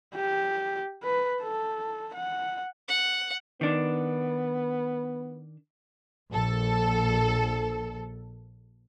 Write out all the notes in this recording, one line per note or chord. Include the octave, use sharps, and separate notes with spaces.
G4
B4
A4
F#5
F#5
D#3 B3 D4
A#1 A4